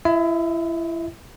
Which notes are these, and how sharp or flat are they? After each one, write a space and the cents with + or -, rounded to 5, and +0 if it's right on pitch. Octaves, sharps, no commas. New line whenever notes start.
E4 +30 E5 -40